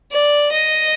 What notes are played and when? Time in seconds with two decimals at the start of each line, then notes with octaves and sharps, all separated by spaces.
0.12 D5
0.52 D#5